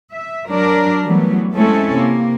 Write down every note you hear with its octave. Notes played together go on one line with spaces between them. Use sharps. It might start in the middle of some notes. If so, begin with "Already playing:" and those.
E5
F#3 D4 A#4
E3 F#3 G3 A3 B3
G#3 A3 C4 C#4 E4 A4
C3 A#3